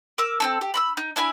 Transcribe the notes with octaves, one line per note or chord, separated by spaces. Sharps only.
A#4 D6 E6
C4 C#4 A4
G4
B5 C6 E6
D#4
D4 E4 G#5 B5